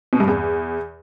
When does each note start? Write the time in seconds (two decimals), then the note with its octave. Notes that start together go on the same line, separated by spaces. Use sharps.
0.13 B2
0.20 G2
0.28 E2